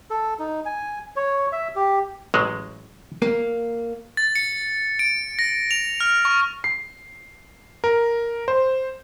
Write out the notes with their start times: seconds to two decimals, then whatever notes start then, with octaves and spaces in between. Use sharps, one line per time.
0.10 A4
0.39 D#4
0.66 G#5
1.16 C#5
1.52 E5
1.76 G4
2.34 A1 F#3 G#3
3.22 A#3
4.17 A6
4.36 C#7
4.99 D7
5.39 A#6
5.71 F7
6.00 F6
6.25 C#6
6.64 C7
7.84 A#4
8.48 C5